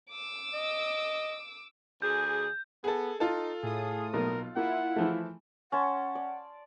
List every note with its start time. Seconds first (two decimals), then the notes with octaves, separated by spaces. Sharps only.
0.11 D6 E6
0.54 D#5
2.02 D2 G#4 G6
2.84 B3 G#4 A4
3.20 D#4 F4 A4
3.63 A2 G#4 D#6
4.14 B1 B2 A#3 A#4
4.56 A#3 E4 F4 F#5
4.96 E3 F3 A3
5.72 C#4 F#5 A5 C6
6.15 D5